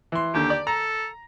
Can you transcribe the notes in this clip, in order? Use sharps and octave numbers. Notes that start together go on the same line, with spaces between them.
E3 C6
D#2 D3 G4
D5
A4 A#5